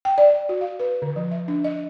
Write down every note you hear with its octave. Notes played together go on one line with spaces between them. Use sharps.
G5
D5
F#4
F5
B4
D3
F3
E5
D4
D#5